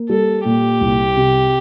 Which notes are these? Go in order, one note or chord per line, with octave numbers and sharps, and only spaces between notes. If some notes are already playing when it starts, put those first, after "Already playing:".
Already playing: A#3
G3 A4
A#2 G4
C2
C3